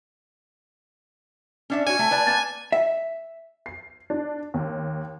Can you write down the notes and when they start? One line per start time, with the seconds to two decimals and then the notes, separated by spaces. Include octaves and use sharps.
1.70 C#4 D4 E5
1.87 F#4 C#5 G#5
1.99 A3 E5
2.11 B4 D5 A5
2.27 A#3 B4 A5
2.72 E5
3.66 C7
4.10 D4
4.54 D#2